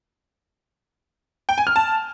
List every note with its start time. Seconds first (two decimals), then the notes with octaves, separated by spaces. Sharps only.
1.49 G5
1.58 G#5
1.67 F6
1.76 A5